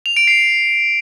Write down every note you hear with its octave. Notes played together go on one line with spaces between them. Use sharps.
F7
D7
C7